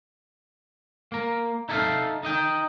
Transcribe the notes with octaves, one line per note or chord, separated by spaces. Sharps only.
A#3 A#4
D#4 E4 A4 C#5 E5 F5
D#4 D#5 G5